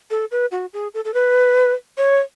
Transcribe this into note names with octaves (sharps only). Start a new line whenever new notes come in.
A4
B4
F#4
G#4
A4
A4
B4
C#5